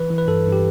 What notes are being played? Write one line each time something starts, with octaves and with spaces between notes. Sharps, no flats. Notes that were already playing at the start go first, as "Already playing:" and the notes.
Already playing: E3 B4
E3
B4
G2 A4
G2
G4